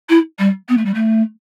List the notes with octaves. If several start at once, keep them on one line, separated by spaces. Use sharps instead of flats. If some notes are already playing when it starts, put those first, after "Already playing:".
E4
G3
B3
A3
G3
A3